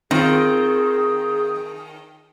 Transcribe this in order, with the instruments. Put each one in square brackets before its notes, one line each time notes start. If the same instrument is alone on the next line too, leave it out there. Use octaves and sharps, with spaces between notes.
[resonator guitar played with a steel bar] D#3 [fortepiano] C4 F4 [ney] G#4